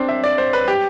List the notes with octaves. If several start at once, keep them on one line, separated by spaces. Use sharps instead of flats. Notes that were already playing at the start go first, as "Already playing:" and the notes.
Already playing: C4 D4 C5
E5
D5
C5
B4
G4